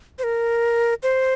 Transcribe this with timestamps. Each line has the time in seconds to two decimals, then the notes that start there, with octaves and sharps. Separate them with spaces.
0.19 C5
0.24 A#4
1.03 C5